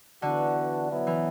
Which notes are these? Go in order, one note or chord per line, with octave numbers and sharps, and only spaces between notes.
D3 E3 B3 D4 F#4
B2 F#3 B3 E4
E3